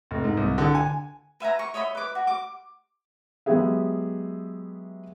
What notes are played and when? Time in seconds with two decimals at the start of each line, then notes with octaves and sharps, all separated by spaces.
0.11 F1
0.24 G#2
0.37 C2
0.58 D3
0.75 G#5
1.40 B4 E5 G#5 A#5
1.59 C#6
1.74 C#5 D#5 E5 B5
1.95 B4 D6
2.15 F#4
2.27 D6
3.46 F#3 G#3 B3 G4 G#4 E5